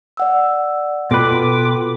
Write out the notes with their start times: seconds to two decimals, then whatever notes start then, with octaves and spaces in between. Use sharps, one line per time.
0.17 D5 F#5 E6
1.11 B2 F4 A4 B4 G5 D6